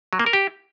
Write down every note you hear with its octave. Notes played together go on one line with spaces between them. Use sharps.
F#3
A#3
A#4
G4